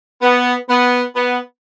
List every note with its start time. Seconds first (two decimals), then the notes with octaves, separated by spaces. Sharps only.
0.21 B3
0.68 B3
1.15 B3